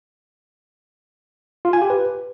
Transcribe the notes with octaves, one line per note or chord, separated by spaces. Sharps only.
F4
G#5
G4
B4